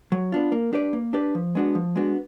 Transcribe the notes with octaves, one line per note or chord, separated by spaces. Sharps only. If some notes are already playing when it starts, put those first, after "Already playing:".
F#3
B3 D4 F4
A#3
D4 G4 B4 D5
A#3
D4 G4 B4 D5
F3
G#3 B3 D4 F#4
F3
G#3 B3 D4 F#4